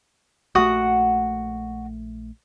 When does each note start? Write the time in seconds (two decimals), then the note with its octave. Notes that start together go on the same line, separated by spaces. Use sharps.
0.55 A#1 A3 F#4 F#5 D#6